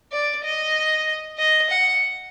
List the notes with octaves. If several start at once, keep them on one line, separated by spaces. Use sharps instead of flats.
D5
D#5
D#5
F#5